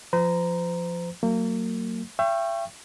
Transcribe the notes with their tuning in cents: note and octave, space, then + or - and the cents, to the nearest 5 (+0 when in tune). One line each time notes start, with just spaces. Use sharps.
F3 +0 C5 -40 A#5 +0
F#3 +0 A#3 -35
E5 +40 G5 +0 C#6 -20